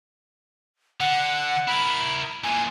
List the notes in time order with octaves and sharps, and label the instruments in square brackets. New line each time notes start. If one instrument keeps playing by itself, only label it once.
[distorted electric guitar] D3 [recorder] F#5
[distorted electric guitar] E4 A#4 [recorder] B5
[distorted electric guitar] A#2 E3 [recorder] G#5